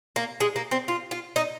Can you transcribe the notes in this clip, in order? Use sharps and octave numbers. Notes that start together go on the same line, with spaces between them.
A#3
G#3
A#3
C4
F4
F4
D#4